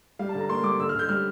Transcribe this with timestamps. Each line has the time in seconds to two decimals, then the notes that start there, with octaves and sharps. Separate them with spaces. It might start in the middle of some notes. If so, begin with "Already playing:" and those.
0.19 G3 F5
0.29 A5
0.34 D3
0.39 A#5
0.49 A#3 C6
0.64 G3 D6
0.79 D3 E6
0.89 F6
0.94 D3 G6
1.09 G3 F6